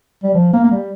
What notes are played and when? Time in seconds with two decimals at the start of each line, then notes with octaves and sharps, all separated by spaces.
0.23 G3
0.34 F3
0.53 A#3
0.64 A#3
0.71 G3